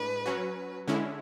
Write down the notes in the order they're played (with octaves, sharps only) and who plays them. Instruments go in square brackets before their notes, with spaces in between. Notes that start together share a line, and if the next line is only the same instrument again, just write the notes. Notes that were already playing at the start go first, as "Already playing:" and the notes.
Already playing: [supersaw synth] A2 G#3 D4 [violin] B4
[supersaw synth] F#3 C#4 F#4
D3 G#3 C#4 E4